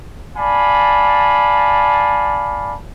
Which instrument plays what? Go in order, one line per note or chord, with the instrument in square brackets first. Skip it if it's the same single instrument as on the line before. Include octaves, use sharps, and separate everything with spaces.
[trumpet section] D5 F5 G#5 A5 B5